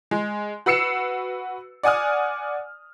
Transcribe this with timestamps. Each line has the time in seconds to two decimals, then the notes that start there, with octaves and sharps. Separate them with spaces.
0.11 G#3
0.66 F#4 B4 E6 C7 C#7 E7
1.83 D5 F#5 G#5 D#6 F6